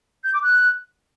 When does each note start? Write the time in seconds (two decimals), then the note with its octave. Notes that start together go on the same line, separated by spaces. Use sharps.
0.24 G6
0.34 D6
0.43 F#6